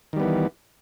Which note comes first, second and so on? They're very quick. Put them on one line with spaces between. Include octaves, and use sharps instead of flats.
D#3 G3 B3 E3